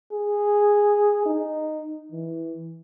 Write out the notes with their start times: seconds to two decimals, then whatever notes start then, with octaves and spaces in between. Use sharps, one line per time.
0.12 G#4
1.26 D#4
2.12 E3